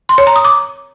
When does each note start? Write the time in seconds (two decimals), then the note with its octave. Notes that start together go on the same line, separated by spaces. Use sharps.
0.09 C6
0.18 C#5
0.27 A#5
0.36 D#6
0.45 D6